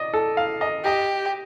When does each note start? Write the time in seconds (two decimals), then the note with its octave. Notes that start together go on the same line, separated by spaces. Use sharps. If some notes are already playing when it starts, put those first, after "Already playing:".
Already playing: D5 D#5
0.14 A4
0.37 F5
0.61 D#5
0.84 G4 D#5